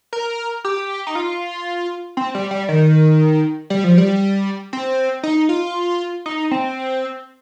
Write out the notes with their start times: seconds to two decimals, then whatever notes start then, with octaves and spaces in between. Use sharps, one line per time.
0.13 A#4
0.64 G4
1.07 D#4
1.15 F4
2.17 C4
2.35 G3
2.51 G3
2.68 D#3
3.70 G3
3.84 F3
3.98 G3
4.73 C4
5.23 D#4
5.49 F4
6.26 D#4
6.51 C4